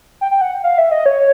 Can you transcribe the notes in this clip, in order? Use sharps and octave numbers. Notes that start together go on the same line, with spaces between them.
G5
G5
F#5
F5
E5
D#5
C#5